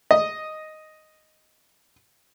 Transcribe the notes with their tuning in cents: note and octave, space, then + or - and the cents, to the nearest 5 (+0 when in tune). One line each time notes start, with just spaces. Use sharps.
D#5 +0